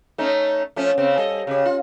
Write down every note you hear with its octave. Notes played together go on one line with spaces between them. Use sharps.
A3 C#4 D#4
F3 A3 C#4
C#3 C4
G3 A4 D#5
C#3 G4
F4